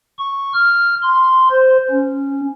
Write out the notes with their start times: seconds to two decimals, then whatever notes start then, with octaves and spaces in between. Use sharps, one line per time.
0.19 C#6
0.54 F6
1.02 C6
1.51 C5
1.91 C#4